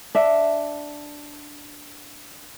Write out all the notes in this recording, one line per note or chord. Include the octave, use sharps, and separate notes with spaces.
D4 E5